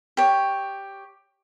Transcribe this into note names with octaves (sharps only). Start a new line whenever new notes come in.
G4 C#5